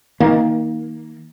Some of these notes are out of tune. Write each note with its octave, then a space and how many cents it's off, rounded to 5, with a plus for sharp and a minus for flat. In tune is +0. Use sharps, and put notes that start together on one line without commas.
D#3 +30 A#3 +5